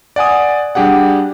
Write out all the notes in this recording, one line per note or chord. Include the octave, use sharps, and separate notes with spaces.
D5 F#5 G#5 D#6
G3 D4 G4 G#4 F#5